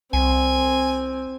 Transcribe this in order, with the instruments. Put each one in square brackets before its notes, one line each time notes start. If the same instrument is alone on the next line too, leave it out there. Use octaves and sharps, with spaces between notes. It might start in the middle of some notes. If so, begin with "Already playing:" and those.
[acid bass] C2 [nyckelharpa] C4 [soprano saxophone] G#5